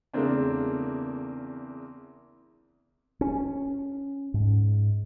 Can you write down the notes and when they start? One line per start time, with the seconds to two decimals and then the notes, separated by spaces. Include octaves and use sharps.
0.13 E2 C#3 A3 A#3 C4 D4
3.21 C#4
4.34 G#2